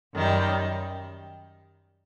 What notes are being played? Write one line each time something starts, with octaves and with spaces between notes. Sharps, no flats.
F#2 D#3 G3